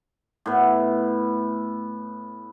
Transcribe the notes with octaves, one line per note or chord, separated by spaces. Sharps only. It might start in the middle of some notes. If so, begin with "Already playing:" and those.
A2 B3